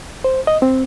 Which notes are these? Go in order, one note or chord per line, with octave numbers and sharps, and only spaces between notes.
C5
D#5
C4